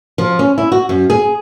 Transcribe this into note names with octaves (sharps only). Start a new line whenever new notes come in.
F3
C#4
E4
F#4
F#2
G#4